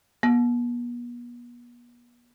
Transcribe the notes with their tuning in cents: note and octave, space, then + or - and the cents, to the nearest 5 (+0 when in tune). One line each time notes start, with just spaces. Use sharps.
B3 -40